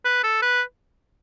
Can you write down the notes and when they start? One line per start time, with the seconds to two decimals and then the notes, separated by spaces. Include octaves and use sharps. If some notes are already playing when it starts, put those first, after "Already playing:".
0.05 B4
0.23 A4
0.42 B4